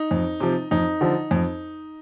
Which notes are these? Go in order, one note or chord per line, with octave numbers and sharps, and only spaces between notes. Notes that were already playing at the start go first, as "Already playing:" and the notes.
Already playing: D#4
F2
C3 F3
F2 D#4
D3 F3
F2